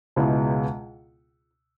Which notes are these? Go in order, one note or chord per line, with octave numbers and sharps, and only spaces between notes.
C#2 B2 G#3 B3 E4